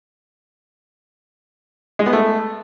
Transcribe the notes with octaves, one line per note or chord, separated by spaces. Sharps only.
G#3
B3
A3